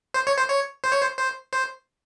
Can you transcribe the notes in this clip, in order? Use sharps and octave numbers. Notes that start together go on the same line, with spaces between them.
C5
C#5
C5
C#5
C5
C#5
C5
C5
C5